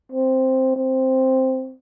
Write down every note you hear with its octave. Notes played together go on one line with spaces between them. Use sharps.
C4
C4